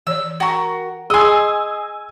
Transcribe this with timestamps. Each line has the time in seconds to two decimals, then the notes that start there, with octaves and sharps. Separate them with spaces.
0.07 E3 C#5 D5 E6
0.40 F#4 A#4 G5 C#6
1.10 G#4 D#5 G#5 C6 E6